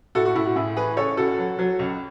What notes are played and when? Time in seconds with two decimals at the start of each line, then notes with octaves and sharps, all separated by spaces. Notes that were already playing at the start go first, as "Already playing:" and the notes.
0.15 A2 F#4 A4
0.25 F#4
0.36 A2 E4
0.46 F#4
0.56 A2 E4 G#4
0.77 E3 G#4 B4
0.97 C#3 A4 C#5
1.17 C#2 F#4 A4
1.38 F#3
1.59 F#3
1.79 C#2